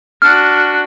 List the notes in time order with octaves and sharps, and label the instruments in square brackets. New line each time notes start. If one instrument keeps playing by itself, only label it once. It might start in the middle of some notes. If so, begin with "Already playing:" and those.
[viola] D4 F#4 [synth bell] F6